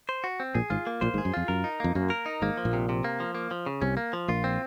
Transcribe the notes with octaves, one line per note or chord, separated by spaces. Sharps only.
C5
F#4
C4
A#1 A#2 G#4
G#1 G#2 F4
A#3
A#1 A#2 C5
G#1 G#2
G#4
F#2
F2 F4
F#2 A#4
D#4
F2 A#3
F#2 A#3
A#4
D#4
G#1 G#2 A#3
F3
A#1 A#2
C3
C3
A#3
F3
A#3
F3
C#3
C2 C3 C#4
A#3
F3
A#1 A#2 F4
C4